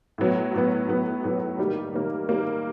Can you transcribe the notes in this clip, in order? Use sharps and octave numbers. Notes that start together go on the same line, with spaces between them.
A2 F#3 B3
A2 F#3 B3
A2 F#3 B3
A2 F#3 B3
D#3 G3 A#3
D#3 G3 A#3
D#3 G3 A#3